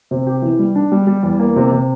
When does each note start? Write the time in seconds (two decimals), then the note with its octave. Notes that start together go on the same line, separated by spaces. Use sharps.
0.11 C3
0.27 G4
0.42 E3
0.59 G3
0.75 D4
0.92 G3
1.07 G3
1.23 E2
1.39 A#3
1.56 C3
1.72 C3